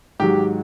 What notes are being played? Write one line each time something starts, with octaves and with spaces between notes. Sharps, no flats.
G#2 D#3 F#3 G4